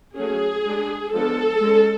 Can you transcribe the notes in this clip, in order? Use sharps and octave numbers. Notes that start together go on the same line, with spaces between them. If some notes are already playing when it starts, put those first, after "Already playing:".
F#3 A3 C#4 G#4
G#3 D4
F3 G#3 B3 D4 A4
G#3 C#4